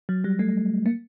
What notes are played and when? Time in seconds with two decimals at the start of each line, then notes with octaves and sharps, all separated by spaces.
0.09 F#3
0.24 G3
0.39 A3
0.86 A#3